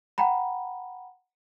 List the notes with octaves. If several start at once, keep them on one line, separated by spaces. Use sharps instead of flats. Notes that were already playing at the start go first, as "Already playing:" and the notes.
F#5 G5 A#5 B5